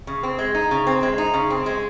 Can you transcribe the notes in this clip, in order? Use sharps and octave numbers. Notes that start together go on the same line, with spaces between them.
C#3
C4
G#3
D#4
C#3
C4
G#3
D#4
C#3
C4
G#3